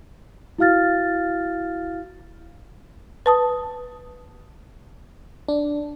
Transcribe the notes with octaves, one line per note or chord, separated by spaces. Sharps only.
E4 F#4 F5 F6 A6
B4 A5 D#6
D4